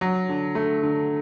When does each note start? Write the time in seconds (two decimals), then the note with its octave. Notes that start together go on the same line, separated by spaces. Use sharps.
0.01 F#3
0.29 D3
0.55 A3
0.83 D3